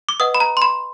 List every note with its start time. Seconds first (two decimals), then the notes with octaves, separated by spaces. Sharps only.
0.09 D6
0.20 B4 D#5 F#5 D#6
0.34 B5
0.40 A#5
0.57 C6
0.62 B5